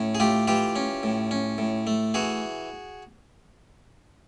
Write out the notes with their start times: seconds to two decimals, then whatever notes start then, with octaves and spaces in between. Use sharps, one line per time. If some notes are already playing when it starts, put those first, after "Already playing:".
Already playing: A2 C#4
0.15 G#4
0.20 A3 F4 G4
0.48 E3 F4 G4
0.76 C#4
1.03 A2
1.31 C#4
1.58 A2
1.87 A3
2.14 E3 F#4 G#4